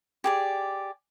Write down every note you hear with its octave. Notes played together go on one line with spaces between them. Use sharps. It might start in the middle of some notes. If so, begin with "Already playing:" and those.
G4 G#4 D5